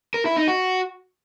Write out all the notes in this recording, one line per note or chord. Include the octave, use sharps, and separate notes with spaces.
A#4
E4
D#4
F#4